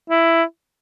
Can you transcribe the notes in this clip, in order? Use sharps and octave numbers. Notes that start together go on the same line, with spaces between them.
E4